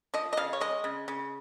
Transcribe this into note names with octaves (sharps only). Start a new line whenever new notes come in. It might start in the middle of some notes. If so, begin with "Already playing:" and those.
F3 D#5
D#5
C#3 F5
C#5
G#3 D#5
C#3
C#3